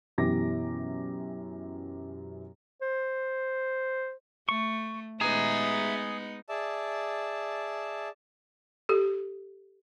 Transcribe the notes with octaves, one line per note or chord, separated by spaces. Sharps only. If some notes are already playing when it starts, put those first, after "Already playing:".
F#2 B2 E3 G4 D6 A#6
C5
A3 C#6
G#3 B3 D#4 G#4 E5 A#5
G#4 D5 E5 A5
G4 A4